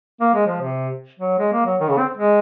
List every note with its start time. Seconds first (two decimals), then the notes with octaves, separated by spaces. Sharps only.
0.21 A#3
0.34 G#3
0.47 F3
0.61 C3
1.20 F#3
1.38 G#3
1.52 A#3
1.66 F#3
1.80 D#3
1.89 C#3
1.98 C4
2.18 G#3